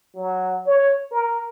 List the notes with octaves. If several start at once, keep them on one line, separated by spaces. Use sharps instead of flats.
F#3
C#5
A#4